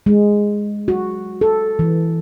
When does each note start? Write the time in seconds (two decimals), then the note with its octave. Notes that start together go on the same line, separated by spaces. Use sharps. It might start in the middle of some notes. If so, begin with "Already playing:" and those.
0.06 G#3
0.88 F#4
1.41 A4
1.79 E3